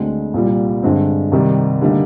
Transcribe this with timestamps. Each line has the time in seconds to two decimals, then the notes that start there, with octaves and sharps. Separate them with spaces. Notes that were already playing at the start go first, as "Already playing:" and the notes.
Already playing: D2 D3 G#3 C4
0.34 C2 A#2 G3
0.83 G2 D3 G#3 C4
1.32 C2 C3 D#3 G3
1.81 D3 G3 A#3 D#4